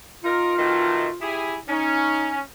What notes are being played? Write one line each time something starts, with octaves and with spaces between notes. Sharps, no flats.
D#4 F4 A#4
B2 D#3 A3
E4 G4 G#4
C#4 D#4